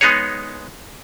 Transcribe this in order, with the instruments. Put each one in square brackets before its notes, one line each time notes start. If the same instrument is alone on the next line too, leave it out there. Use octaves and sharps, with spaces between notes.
[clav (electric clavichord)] G#3 B3 D#4 G#4 C#5